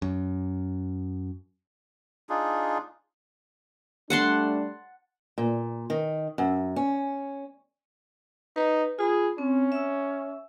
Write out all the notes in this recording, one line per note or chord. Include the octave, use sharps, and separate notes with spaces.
F#2
D4 D#4 F4 G#4
G3 A3 D4 F#5 A5 C6
A#2
D#3
F#2
C#4
D#4 B4
F4 G#4 B5
C4 C#4
E5 E6